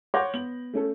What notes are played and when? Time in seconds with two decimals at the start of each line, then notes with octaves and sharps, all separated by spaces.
0.14 C#5 F#5 C6 D6 G6 A#6
0.34 B3 F#7
0.73 A3 C#4 A4